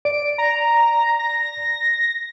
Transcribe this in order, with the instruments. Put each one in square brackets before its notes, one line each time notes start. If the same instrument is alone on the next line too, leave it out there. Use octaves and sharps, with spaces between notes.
[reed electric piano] D5 [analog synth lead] D7
[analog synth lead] A#5
A#6